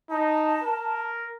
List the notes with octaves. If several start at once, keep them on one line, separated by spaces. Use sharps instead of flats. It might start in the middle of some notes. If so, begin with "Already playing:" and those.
D#4 A5
A#4